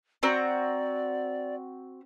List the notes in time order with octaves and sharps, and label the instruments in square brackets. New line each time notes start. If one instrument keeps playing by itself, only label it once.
[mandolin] C4 F#4 A#5 [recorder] D5